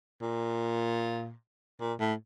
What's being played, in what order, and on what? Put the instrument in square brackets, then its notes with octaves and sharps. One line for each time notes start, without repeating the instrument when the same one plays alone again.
[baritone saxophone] A#2
A#2
A2